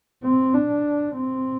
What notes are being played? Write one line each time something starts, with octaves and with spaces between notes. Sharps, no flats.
C4
D4
C4